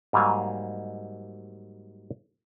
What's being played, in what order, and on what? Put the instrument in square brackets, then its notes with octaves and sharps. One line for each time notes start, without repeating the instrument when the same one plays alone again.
[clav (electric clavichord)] G#2 F#3 G3 A#3 F5 G#5